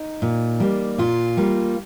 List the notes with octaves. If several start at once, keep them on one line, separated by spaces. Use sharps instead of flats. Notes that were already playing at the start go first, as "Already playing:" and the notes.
Already playing: D#4
A#2
G3 A#3
A#2 F4
G3 A#3